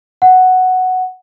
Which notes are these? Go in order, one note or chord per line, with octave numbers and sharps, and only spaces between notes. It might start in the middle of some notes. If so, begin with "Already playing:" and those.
F#5